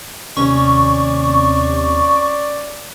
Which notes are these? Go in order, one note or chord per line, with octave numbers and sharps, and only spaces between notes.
D#2 C3 C#4 D5 C#6